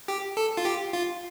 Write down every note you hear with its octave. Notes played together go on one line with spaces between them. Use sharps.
G4
A4
F4
G4
F4